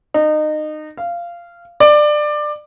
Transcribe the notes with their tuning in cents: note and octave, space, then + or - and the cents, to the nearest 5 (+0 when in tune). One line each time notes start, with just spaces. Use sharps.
D#4 -25
F5 -15
D5 +20